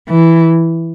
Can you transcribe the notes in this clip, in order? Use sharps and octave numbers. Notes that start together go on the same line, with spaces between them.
E3